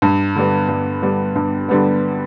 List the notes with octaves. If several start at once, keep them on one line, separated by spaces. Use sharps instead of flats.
G2
D3 G3 B3
G2
D3 G3 B3
G2
D3 G3 B3